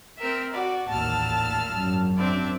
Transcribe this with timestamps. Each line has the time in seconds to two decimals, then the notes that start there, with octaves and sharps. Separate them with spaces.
0.19 C4 A#4 E5
0.53 F#4 D5
0.89 A1 D#2 A#2 A5 E6 F6
1.72 G#1 F#2
2.18 C4 D4 D5 E5